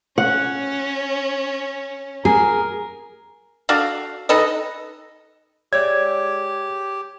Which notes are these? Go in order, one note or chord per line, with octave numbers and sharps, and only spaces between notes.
C#4 F#5
G#4 A#4
D4 F#4 A4 F5
D#4 A4 B4 D#5
G#3 G4 C#5 D5 E5 G#6